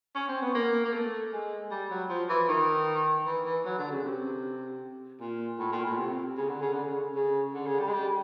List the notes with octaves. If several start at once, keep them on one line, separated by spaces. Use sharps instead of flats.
C#4
C4
B3
A#3
A#3
A3
G#3
G3
F#3
F3
E3
D#3
E3
E3
F#3
D3
C#3
C3
A#2
A2
A#2
A2
C3
C#3
D3
C#3
D3
C#3
C#3
D3
C#3
G3
G#3
G3